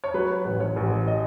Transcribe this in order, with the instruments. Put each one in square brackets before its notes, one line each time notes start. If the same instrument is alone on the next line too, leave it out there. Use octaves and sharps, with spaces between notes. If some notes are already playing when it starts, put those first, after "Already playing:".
[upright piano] C#5
F#3 B4
A1
C#5
A1
D#5